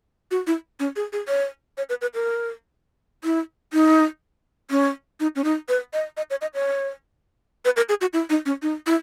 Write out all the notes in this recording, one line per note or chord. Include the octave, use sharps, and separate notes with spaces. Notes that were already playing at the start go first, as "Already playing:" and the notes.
F#4
E4
C#4
G#4
G#4
C#5
C#5
B4
B4
A#4
E4
D#4
C#4
D#4
C#4
D#4
B4
D#5
D#5
C#5
D#5
C#5
B4
A#4
G#4
F#4
E4
D#4
C#4
D#4
E4